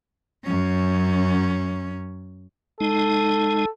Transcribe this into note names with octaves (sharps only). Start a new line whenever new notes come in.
F#2 C#4
G#3 D#4 A4